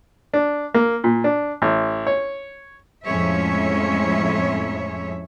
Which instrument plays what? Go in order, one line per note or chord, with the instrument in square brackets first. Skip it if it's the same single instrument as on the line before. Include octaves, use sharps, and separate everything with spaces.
[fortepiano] D4
A#3
A#2
D4
A1
C#5
[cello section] F2 A2 G#3 C#4 C#5 E5